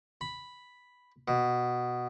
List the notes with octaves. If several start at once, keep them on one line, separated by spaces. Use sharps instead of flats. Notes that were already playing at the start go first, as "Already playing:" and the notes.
B5
B2